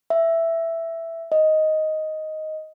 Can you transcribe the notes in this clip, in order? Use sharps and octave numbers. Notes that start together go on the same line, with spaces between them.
E5
D#5